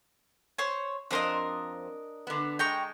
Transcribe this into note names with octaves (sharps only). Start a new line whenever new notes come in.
C5 C#5
F2 C4 D4 A#4 C5 D#5
D3 B3
G#3 G5 A#5 C#6